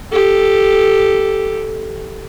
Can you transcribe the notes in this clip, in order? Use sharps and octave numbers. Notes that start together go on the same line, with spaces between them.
G4 A4